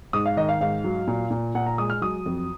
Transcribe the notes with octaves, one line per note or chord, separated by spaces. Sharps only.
G#2 D#6
F5
D#3 D#5
F5
G#2 F5
F#3
A#2
A#2
A#2 F#5
A#5
G#3 D#6
F6
F#3 D#6
F2